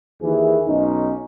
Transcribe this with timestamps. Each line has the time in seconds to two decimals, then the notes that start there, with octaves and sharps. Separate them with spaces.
0.21 D#2 D#3 E3 G#4
0.67 B1 C#4 D#4